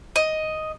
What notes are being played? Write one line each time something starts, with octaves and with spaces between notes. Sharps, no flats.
D#5